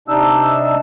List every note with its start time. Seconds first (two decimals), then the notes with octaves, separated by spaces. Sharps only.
0.08 C3 D4 D#4 E6